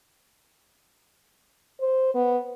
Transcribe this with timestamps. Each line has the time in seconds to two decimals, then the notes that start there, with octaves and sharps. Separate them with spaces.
1.80 C5
2.15 B3